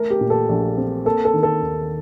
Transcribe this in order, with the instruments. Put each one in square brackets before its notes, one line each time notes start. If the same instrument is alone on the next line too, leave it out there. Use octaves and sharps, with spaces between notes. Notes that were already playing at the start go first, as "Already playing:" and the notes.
Already playing: [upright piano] A3 A#4
G4
A#2
A4
A#1
C4
A#3 A4
A4
D#3
A4
D#2